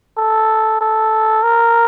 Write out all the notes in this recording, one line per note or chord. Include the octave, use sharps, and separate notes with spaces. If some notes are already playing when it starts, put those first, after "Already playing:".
A4
A4
A#4